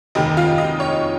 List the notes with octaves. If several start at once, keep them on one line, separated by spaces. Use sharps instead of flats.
F1 D#2 D#3 D#5
F4 F5
D#5
C#5